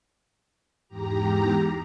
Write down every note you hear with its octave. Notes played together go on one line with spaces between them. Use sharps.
E2 G#2 G4 A#5